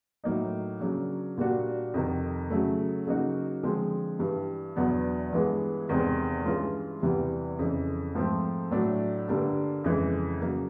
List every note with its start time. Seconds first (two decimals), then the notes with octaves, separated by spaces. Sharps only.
0.24 A2 F#3 A#3 D#4
0.80 C#3 F#3 A#3 D4 F#4
1.37 A#2 G3 A#3 D4 F#4
1.94 F2 C3 D#3
2.50 C#3 F#3 A3
3.07 C#3 F#3 A#3 D#4 F#4
3.63 D3 F3 G#3 C4
4.19 G2 E3 G3
4.76 E2 B2 F#3 B3 D4
5.32 G2 E3 G#3 B3
5.89 E2 C3 D#3 G#3 C4
6.45 G2 E3 G#3 C#4 F4
7.02 E2 C3 E3 G3 B3
7.59 F2 C#3 E3
8.15 G#2 F3 A3 C4
8.71 A2 F#3 A3 D4
9.28 G2 D3 G3 A#3 D4
9.84 F2 C#3 E3 G#3
10.41 C#3 F#3 A#3